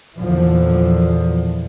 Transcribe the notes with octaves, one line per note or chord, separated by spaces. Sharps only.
E2 A#2 D3 E3 F3